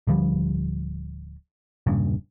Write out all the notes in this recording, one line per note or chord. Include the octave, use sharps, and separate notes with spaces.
D1 D3 F3 G3
E1 G2 A#2 C#3